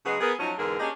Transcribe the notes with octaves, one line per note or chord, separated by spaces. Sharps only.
C#3 F#3 G#3 B3 G#4
B3 G#4 A#4
F3 F#3 A3 C#4 D#4 F#4
E2 G#2 D3 E3 G#4 A#4
A#3 C#4 D4 G4 G#4 D#5